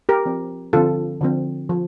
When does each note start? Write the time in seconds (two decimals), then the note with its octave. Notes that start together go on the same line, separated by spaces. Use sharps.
0.09 G4 A#4
0.26 F3 C4
0.73 D3 F3 C4 F4 A4
1.21 D3 F3 C4
1.70 F3